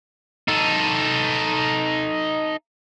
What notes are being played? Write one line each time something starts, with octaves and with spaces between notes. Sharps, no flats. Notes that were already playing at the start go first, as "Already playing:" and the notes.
D#4 A4